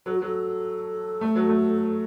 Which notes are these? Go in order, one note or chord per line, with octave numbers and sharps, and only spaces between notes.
F#3 A4
F#4
F#3 A4
A3
F#3
A3